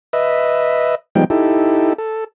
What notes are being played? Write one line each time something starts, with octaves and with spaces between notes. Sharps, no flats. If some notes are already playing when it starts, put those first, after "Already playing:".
B4 D#5 E5
F3 G3 G#3 B3 D#4 G5
D#4 E4 G4 A4
A4